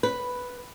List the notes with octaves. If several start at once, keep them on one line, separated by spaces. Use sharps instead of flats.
B4